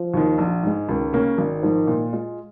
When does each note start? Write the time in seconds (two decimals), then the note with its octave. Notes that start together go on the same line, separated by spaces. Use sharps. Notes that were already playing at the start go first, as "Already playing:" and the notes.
Already playing: F3
0.14 D#2 D#3
0.38 A#1
0.63 G#2 G#3
0.88 C#2 D#3
1.13 C#3 A#3 C#4
1.38 G#1 D#3
1.63 G#2 F3
1.87 A#2
2.13 G#3 F4